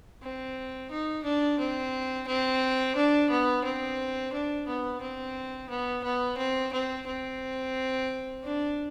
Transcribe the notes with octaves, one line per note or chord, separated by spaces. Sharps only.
C4
D#4
D4
C4
C4
D4
B3
C4
D4
B3
C4
B3
B3
C4
C4
C4
D4